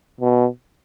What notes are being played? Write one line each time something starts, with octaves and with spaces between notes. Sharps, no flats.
B2